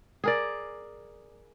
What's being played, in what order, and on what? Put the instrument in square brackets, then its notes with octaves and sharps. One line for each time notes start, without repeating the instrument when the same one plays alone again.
[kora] G#4 A#4 D5